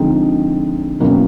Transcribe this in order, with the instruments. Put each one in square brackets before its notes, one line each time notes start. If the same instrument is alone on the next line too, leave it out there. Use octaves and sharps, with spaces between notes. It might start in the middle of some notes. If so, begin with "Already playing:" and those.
Already playing: [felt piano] D3 F3 G#3 C4 D#4
B2 F#3 A#3 C#4 E4